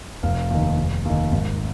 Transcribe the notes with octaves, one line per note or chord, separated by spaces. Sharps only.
F1 F5
D#2 D#3
F1
D#2 D#3
G#1